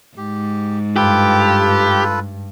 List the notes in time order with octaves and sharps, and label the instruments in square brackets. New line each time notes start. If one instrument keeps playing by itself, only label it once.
[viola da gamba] G#2 [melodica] G4
[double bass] G2 [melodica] F4 A4 B4 [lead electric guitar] G4